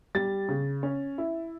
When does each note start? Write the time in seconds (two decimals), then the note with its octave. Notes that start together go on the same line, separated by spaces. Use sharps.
0.15 G3 A6
0.49 C#3
0.83 C#4
1.18 E4